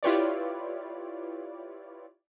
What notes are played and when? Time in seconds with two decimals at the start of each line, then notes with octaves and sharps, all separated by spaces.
0.03 E4 F4 G4 B4 C#5 D5